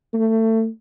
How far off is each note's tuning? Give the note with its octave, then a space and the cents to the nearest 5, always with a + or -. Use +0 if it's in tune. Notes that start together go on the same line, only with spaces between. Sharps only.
A3 +25